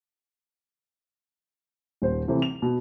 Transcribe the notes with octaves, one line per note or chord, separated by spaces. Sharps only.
D#1 C5
C3 E3 A3 C4
F7
B2